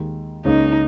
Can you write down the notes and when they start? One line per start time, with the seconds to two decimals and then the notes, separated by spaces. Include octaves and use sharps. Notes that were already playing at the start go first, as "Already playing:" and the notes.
Already playing: D#2 D#3 G#3
0.45 C#2 C#3 A#3 C#4 D#4